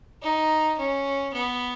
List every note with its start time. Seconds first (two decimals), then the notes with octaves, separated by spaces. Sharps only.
0.22 D#4
0.78 C#4
1.33 B3